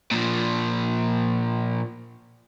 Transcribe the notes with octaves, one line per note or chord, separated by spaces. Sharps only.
A#2 F3